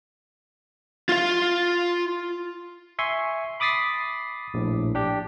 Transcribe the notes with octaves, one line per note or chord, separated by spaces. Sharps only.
F4 F5
E5 G#5 C6 C#6
B5 D6 D#6 A6 B6 C7
A#1 A2
D4 G4